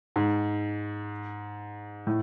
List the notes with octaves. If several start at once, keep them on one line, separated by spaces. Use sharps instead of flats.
G#2
A2